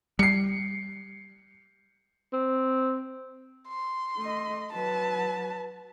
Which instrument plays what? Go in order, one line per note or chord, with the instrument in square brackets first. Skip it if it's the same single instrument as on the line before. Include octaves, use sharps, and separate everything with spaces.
[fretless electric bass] G3 [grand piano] C7 C#7
[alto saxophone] C4
[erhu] C6
[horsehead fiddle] A3 D#5
[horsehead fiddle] F#3 B4 [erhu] A5